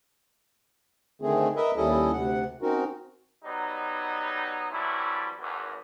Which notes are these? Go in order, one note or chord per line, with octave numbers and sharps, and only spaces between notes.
D3 D#3 A3 C4 G#4
A#4 B4 D#5 E5
D#2 G3 C#4 E4 A4 D#5
D2 C3 F#5
C4 C#4 D#4 F#4 A#4
F#3 G3 B3 D#4
E3 F#3 G3 A3 C4 E4
G#1 E2